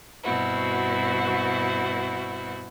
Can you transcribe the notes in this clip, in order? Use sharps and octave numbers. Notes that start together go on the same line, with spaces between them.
G2 B2 C4 E4 F#4